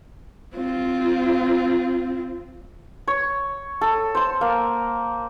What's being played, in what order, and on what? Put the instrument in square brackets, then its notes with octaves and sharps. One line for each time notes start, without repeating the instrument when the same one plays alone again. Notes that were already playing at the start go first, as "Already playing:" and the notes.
[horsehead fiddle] C4 F4
[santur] C#5
A4
C5 C6
A#3